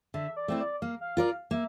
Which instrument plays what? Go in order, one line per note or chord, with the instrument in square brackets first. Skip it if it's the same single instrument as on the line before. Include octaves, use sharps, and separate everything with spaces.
[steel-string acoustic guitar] D3 [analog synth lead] E5
[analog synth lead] D5
[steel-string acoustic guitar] A3 C4 E4
[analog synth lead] D5
[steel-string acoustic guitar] A#3 [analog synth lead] F5
[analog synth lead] F5
[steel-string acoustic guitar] F4 A#4 D5
[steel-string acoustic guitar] A#3 [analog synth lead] E5